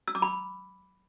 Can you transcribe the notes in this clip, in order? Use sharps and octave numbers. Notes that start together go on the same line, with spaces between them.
E6
D6
B5